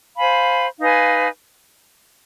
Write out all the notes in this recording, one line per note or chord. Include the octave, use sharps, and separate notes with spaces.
C5 F5 G#5 B5
D#4 B4 F5 G#5